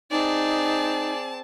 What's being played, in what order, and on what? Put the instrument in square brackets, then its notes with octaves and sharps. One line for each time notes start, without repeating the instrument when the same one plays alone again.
[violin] C4 A5 [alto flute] D#4 [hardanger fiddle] G#4 D5